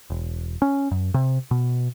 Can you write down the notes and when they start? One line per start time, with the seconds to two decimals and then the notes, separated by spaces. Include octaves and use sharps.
0.10 E1
0.62 C#4
0.91 F#2
1.14 C3
1.51 B2